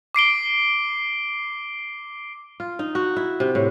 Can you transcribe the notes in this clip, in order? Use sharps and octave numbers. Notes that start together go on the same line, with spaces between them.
D6 C7 D7 G7
F4
D#4
F#4
E4
C3
A2